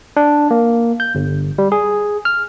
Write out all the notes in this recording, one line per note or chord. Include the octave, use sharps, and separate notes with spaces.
D4
A#3
G6
G1
G3
G#4
F6